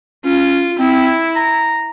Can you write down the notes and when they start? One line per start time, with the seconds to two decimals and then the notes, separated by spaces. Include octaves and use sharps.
0.25 C#4 F4
0.79 C4 E4
1.36 A#5